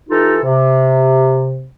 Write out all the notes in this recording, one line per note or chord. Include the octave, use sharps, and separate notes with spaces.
E3 D#4 F4 G4 A4
C3